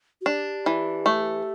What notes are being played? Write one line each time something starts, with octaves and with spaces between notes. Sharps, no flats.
F#4
D4 G4
E3
A3